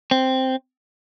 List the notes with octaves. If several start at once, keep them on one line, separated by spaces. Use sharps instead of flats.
C4